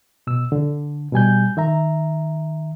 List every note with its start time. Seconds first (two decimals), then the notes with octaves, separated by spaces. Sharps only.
0.27 B2 E6
0.52 D3
1.12 B2 G3 G#5 G6
1.57 D#3 E5 A#5